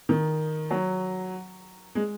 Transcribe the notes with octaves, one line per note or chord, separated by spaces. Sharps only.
D#3
F#3
G#3